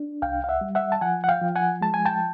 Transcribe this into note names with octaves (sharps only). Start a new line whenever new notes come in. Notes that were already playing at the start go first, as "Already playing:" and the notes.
Already playing: D4
C2 F5 G5
F5
E5 F#5
G3
E5 F#5
A5
F3 F#5 G#5
F#5
F5 G5
F3
F#5 G#5
G#3 A5
G#5
G5 A5